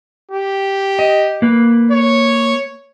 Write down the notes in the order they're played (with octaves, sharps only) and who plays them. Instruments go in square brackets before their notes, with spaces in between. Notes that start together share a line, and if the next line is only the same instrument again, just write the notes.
[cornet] G4
[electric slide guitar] D#5
A#3 B4
[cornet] C#5